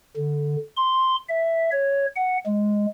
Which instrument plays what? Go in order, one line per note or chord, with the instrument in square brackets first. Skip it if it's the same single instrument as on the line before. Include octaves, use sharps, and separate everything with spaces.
[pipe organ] D3
C6
E5
C#5
F#5
G#3